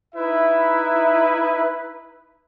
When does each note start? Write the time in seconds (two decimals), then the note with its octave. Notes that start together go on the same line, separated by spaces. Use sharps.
0.15 D#4 E4 B4 E5